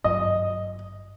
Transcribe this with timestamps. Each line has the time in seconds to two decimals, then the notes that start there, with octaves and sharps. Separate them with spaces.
0.04 G#1 G2 F#3 D#5